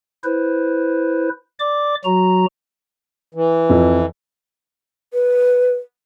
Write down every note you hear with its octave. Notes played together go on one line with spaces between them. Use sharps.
E4 B4 C5
D5 D6
F#3 F#4 A#5
E3
F2 F3
B4